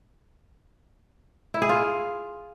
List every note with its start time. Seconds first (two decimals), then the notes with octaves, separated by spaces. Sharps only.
1.54 E4
1.62 G#4
1.69 F4